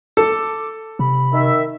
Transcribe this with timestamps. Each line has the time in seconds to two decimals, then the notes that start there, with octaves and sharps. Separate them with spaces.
0.17 A4 D6
0.99 C3 B5
1.33 D#3 E5